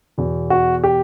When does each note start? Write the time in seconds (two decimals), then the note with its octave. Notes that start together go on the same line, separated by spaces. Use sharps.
0.18 E2 B2
0.50 F#4
0.84 G4